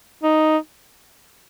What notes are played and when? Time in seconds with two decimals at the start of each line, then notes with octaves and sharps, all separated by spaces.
0.23 D#4